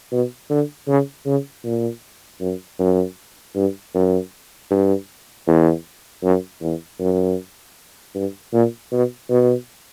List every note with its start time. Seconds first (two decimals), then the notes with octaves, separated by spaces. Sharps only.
0.12 B2
0.50 D3
0.88 C#3
1.26 C#3
1.65 A#2
2.41 F#2
2.80 F#2
3.55 G2
3.95 F#2
4.71 G2
5.48 E2
6.23 F#2
6.62 E2
7.00 F#2
8.15 G2
8.53 A#2
8.92 B2
9.30 B2